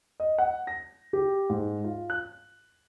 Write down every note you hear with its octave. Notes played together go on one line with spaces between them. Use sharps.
D#5
F#5
A#6
G4
G#2
F4
F#6